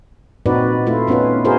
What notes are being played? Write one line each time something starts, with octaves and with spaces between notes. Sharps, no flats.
A#2 C4 D#4 F#4 B4 D5
A3 E4 F4
B3 C#4 D#4 F4 B4
E4 F#4 G#4 A#4 C5